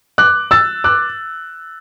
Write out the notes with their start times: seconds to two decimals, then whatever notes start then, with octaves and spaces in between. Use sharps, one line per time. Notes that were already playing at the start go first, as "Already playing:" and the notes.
0.18 D6 F#6
0.51 E6 A6
0.84 D6 F#6